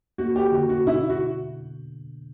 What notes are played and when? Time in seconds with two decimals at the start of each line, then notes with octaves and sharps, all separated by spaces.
0.18 A#3 F#4
0.36 G4
0.52 D3 F#4
0.69 F#4
0.86 B2 E4
1.09 F#4